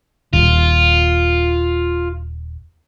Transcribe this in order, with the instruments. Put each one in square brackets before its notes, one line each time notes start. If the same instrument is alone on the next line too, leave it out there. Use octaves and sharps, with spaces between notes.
[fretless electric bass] D#1 [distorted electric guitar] F4